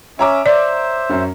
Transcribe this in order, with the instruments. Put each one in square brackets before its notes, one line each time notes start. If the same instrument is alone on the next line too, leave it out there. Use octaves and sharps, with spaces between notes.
[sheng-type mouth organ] C#4 E5 [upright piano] C#5 A#5 D6
[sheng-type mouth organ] C5 E5 [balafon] D5
[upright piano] F#2 C#4